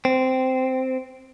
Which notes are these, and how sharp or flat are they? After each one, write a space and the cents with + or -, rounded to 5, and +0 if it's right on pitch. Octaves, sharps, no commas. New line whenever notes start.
C4 -10